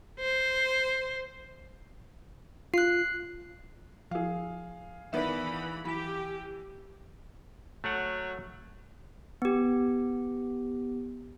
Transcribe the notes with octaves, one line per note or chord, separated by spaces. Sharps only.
C5
F4 F#6 C7
F3 E4 G#4 F5
D#3 E3 B3 B4 D5 E5 B5
E3 G4 B5 B6
F#3 A3 F#5
B3 G4